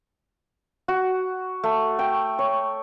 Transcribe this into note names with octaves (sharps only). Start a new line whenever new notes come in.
F#4
A3
G5
C#5